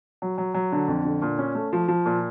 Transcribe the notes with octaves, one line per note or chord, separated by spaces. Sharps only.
F#3
F#3
F#3
D3
F2
D3
A#2
C#4
A3
F3
F3
A#2